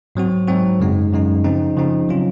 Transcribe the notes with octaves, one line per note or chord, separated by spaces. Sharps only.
G#2 F#3 C4 F#4
G#2 F#3 C4 F#4
F#2 C#3 G#3 D#4
F#2 C#3 G#3 D#4
C#3 F3 C4 D#4
C#3 F3 C4 D#4
F#3 C#4 F4